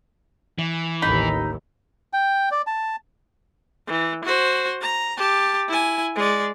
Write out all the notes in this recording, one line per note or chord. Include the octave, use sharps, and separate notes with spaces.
E3
A1 D#2 D#4 B5
G5
D5
A5
E3
F#4 C5
A#5
G4 A5
E4 G#5
G#3 D5